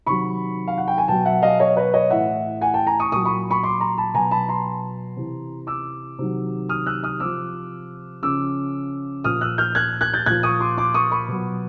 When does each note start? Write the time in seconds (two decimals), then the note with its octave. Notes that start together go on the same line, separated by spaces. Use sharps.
0.06 C3 D#3 F#3 B5 C#6
0.68 F5
0.78 F#5
0.88 G5
0.98 G#5
1.08 B2 F#3 G5 A5
1.25 E5 F#5
1.42 D#5 F5
1.60 C#5 D#5
1.77 B4 C#5
1.94 C#5 D#5
2.10 A2 E3 E5 F#5
2.61 F#5 G#5
2.74 G5 A5
2.87 G#5 A#5
3.00 C#6 D#6
3.12 A#2 F#3 C#6 D#6
3.25 B5 C#6
3.50 B5 C#6
3.63 C6 D6
3.80 A#5 C6
3.98 A5 B5
4.14 B2 F#3 G#5 A#5
4.31 A5 B5
4.49 A#5 C6
5.17 C3 E3
5.67 D6 E6
6.19 C3 D#3 F#3
6.69 D#6 F6
6.86 E6 F#6
7.03 D#6 F6
7.20 C3 F3 D6 E6
8.22 C#3 F3 D6 E6
9.24 A#2 F3 D#6 F6
9.41 E6 F#6
9.58 F6 G6
9.75 F#6 G#6
10.01 F#6 G#6
10.14 G6 A6
10.26 A#2 F3 F#6 G#6
10.43 C#6 D#6
10.60 C6 D6
10.78 C6 D6
10.94 C#6 D#6
11.11 B5 C#6
11.28 B2 F#3